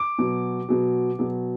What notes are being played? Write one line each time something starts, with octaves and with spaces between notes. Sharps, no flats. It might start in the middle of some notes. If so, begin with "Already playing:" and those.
Already playing: D6
B2 F#3
B2 F#3
B2 F#3